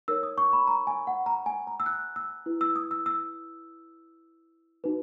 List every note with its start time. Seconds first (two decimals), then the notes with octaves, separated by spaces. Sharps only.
0.08 D#4 A#4 C#5 E6
0.23 D#6
0.38 C#6
0.53 B5
0.67 A#5
0.87 G#5
1.07 F#5
1.26 A#5
1.46 G#5
1.67 A#5
1.80 E6
1.86 F#6
2.16 E6
2.46 E4 B4
2.61 E6
2.76 D#6
2.91 E6
3.06 E6
4.84 D#4 F#4 B4